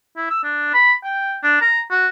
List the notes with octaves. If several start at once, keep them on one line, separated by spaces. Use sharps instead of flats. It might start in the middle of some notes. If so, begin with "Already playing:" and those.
E4
E6
D4
B5
G5
D4
A#5
F#4